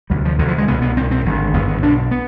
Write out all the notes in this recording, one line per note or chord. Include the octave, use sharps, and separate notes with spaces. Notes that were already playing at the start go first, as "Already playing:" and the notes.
D2 C3 G3
F3
D2 C3 D#3
F3
G#3
C2 B2 B3
B3
C2 B2 C4
C4
G#1 G2 D3
G#1 G2 D3 B3
B3
B1 B2 D4
B3